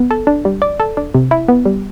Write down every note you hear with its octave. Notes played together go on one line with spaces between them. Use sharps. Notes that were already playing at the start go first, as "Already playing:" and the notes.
Already playing: B3
A4
D4
G3
D5
A4
D4
C3
E4
B3
G3